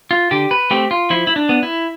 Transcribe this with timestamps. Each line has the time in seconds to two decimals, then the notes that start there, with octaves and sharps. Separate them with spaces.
0.11 F4
0.31 D3 G4
0.51 B4
0.71 A3 C4 G4
0.91 F4
1.10 F3 E4
1.27 E4
1.36 D4
1.49 B3
1.63 E4